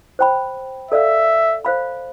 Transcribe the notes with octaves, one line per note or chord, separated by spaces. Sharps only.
C5 G5 B5
A4 D5 E5 F5
C5 F5 B5